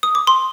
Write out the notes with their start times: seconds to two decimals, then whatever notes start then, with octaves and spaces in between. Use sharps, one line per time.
0.03 D#6
0.15 D6
0.27 C6